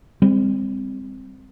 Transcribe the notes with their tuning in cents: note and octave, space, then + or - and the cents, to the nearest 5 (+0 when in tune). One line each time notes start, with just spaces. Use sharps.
G3 +45 C4 +0